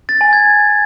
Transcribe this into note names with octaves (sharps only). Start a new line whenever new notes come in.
A6
G#5
G#6